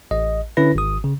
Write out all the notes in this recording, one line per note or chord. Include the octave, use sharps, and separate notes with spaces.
A1 D#5
D3 C#4 E4 B4 A#6
G#1 D#6
C#3